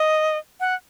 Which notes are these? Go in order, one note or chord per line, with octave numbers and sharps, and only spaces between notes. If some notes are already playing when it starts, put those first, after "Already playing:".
Already playing: D#5
F#5